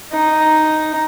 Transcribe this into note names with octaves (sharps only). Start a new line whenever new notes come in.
D#4